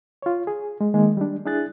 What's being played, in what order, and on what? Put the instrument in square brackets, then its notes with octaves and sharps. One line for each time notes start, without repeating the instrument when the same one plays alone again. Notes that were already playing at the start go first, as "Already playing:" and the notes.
[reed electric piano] F4 C#5
G#4
G#3
D#3 G#3 A#3 G#4
G3 D4
D4 E4 G#4 F#6 A6